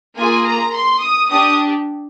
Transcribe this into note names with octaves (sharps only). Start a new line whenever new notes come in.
A#3 F4 G#4 G#5
A#5
C6
D#6
D4 G4 D#6